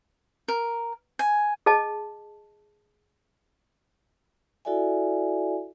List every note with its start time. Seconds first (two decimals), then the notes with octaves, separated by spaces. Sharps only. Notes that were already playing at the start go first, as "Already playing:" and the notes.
0.48 A#4
1.19 G#5
1.66 G#4 D#5 A5
4.65 E4 F#4 A4 D5 E5 G#5